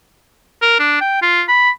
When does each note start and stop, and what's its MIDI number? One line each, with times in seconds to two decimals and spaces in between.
0.62 0.79 70
0.79 1.00 62
1.01 1.19 79
1.22 1.43 65
1.48 1.70 83